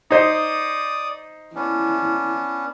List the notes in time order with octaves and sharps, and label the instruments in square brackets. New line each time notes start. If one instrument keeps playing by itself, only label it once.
[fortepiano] D#4 C5 [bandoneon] D5 D#6
[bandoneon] B3 C#4 D4 [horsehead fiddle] E4